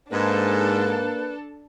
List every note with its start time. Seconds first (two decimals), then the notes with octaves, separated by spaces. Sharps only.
0.12 G#2 A#3 D4 A4 B4